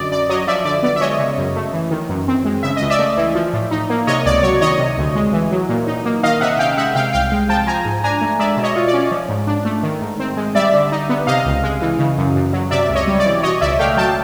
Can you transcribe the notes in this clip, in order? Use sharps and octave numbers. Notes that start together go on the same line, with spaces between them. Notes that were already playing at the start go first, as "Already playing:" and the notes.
Already playing: F#2 D3 D5 D#5
F#2 D5
F#3 C#5 D#5
F3 D5 E5
D3 D5
B3 D5
E5
G#3 C#5 D#5
C#3
F#2
A3
E3
D#3
F#2
C4
G#3
C#3 E5
C#2 D#5
D5 E5
A3
E3
F3
A2
D#4
A#3
C3 C#5 D#5
C#2 D5
F#3 C#5
D#3 C#5 D#5
C3
D2
G#3
E3
F#3
A#2
D#4
A#3
D#3 D#5 F5
C3 E5 F#5
C#4 F5 G5
G#3 E5 F#5
C3 F5 G5
C2 F5 G5
G#3
F3 G5 A5
F3 G#5 A#5
G#2
D4 G#5 A#5
A3
G#3 D5 E5
B2
C#5 D#5
F4
D5
C#4
F3
G#2
D4
A3
D#3
G#2
C4
G#3
G3 D5 E5
D3
D#4
B3
C3 D#5 F5
C#2
G#3
E3
C#3
F#2
F#2
F#3
C3 D5 E5
C#2
C#5 D#5
G3
D5
E3
B2 C#5 D#5
C#2 D5 E5
A3 F5 G5
F#3 G5 A5